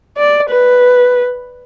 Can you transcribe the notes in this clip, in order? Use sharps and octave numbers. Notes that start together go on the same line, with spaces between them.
D5
B4